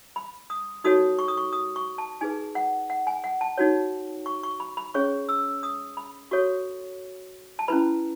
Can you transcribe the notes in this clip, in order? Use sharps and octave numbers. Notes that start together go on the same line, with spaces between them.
B5
D#6
D#4 F#4 A4 C#5 D#6
C#6
D#6
C#6
D#6
C#6
A5
D#4 G#4 B4 G#5
F#5
F#5
G#5
F#5
A5
D#4 F#4 C#5
C#6
C#6
B5
B5
C#4 G#4 C#5 C#6
E6
D#6
B5
F#4 A4 C#5 C#6
A5
C#4 E4 B4 B5